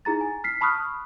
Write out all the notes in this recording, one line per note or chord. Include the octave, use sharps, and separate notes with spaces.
D#4 E4 G#4 A#5 A6
G#5
F6 B6 C7
A5 B5 C#6 D#6 F6 F#6